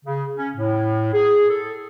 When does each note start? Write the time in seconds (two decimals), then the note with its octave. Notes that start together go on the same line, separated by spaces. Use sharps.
0.04 C#3
0.36 C#4
0.56 A2
1.13 G#4
1.50 A4